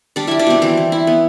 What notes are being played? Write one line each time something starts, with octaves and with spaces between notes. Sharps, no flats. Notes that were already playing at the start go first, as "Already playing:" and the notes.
G3 D4 D5
G3 E4 E5
D4 D5
B2 C4 C5
E3 C4 C5
E3
E4
B3